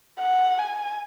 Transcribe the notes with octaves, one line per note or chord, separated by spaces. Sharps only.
F#5
G#5